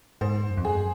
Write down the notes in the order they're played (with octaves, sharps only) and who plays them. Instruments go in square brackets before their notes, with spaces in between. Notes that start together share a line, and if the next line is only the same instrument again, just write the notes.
[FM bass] G#2 [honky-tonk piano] C5
[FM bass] F#2
F2
[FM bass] F#2 [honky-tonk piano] G#4